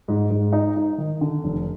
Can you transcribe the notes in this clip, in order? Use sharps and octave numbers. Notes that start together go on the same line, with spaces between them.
G#2
G#2
D#4
D#4
D#3
D3
F1